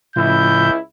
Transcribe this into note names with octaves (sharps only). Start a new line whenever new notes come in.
C#2 A2 C#3 F3 E4 G6